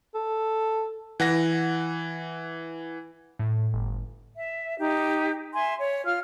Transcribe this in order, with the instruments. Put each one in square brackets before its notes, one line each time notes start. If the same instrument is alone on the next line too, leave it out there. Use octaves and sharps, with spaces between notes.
[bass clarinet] A4
[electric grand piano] E3 F#5 A#6
[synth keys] A2
G1
[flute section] E5
D#4 G4
E5 G#5 C6
C#5
F4 F6